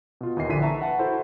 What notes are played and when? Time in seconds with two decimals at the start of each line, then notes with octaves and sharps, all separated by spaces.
0.21 B2 F4
0.37 D#2 E3 D#5 C7
0.49 A#1 D3 E3 B6 D#7
0.62 E5 A5 A#5 C#6
0.80 B4 F#5 A5
0.99 E4 F#4 A4 C5